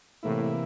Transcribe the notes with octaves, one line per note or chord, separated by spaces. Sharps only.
A2 C3 E3 A#3 E4